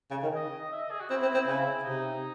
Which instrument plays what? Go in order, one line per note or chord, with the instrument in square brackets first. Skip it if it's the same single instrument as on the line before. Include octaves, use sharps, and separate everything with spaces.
[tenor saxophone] C#3
D#3
[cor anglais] D#5
E5
D#5
G#4
F#4
[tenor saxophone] C4 [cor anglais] E4
[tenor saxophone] C4
C4
C#3
[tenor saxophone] C3 [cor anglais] D#4